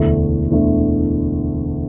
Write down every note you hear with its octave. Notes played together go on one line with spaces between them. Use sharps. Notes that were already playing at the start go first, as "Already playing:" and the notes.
Already playing: E1 D2 D3 A3 E4
E1 D2 D3 A3 E4